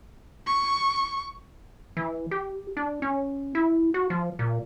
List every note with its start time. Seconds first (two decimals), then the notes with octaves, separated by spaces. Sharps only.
0.46 C#6
1.97 E3
2.31 G4
2.77 D4
3.02 C#4
3.55 E4
3.94 F#4
4.10 F3
4.39 A#2